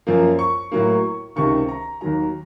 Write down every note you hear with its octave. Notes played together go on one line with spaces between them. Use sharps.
F#2 F3 A#3
C#6
A2 F#3 A#3
C#2 C3 D#3 C#6
A#5
D#2 D#3 F#3 A#5